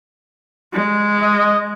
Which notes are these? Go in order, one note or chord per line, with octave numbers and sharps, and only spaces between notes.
G#3
D#5